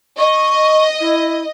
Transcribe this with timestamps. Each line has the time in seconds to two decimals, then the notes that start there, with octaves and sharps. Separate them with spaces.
0.18 D#5 C#6
1.00 E4